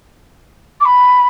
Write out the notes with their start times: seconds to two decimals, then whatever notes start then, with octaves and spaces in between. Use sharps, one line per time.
0.80 D6
0.85 B5